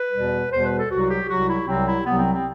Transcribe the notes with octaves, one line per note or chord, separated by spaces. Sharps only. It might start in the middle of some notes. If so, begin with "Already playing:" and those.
Already playing: B4
E2 B2 G3
E2 B2 G3 C5
B4
A4
C2 C3 F#3 F#4
G4
C2 C3 F#3 F#4
E4
C2 C3 F#3 C4
E4
C2 C3 F#3 B3
C4
C4